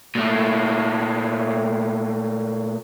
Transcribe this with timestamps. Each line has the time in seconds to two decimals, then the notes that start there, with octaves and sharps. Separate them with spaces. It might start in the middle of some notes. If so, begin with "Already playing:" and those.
0.15 A#2 A3